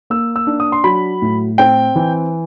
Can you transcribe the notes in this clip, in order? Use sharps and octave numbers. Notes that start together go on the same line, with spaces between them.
A#3 E6
E6
D4
D#6
C6
F#3 B5
A2
C4 G5
E3